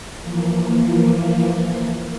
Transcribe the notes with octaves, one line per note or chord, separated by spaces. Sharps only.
E3 F3 A#3